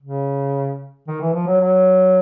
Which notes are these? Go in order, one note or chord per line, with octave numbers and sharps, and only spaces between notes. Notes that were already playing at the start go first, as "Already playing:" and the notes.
C#3
D#3
E3
F3
F#3
F#3